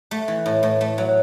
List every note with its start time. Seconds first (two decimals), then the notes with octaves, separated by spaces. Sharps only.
0.11 A3
0.28 E3
0.46 A2
0.63 A2
0.81 A3
0.98 F#3